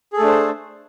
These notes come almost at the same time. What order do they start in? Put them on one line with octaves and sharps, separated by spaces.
G#4 A4 A3 D4 C5